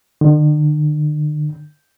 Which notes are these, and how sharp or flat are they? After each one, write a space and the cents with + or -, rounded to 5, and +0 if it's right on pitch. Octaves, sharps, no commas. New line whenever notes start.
D3 +45